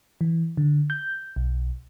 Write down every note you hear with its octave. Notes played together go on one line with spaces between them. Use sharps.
E3
D3
G6
B1